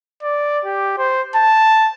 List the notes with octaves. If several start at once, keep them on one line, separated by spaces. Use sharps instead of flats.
D5
G4
C5
A5